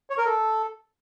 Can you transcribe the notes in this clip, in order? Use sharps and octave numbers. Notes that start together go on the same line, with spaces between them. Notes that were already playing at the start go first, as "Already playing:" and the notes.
C#5
A#4
A4